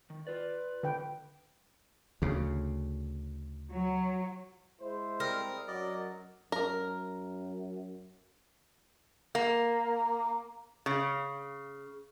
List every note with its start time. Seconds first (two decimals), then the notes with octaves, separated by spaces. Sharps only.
0.10 D#3
0.27 F4 B4 D5
0.83 D3 B4 G5
2.22 D2 C#3
3.72 F#3
4.80 G#3 E4 C5
5.20 G3 C4 A#4 D#6
5.68 F#2 F#3 D5 D#5
6.52 F#2 A#4
9.35 A#3
10.86 C#3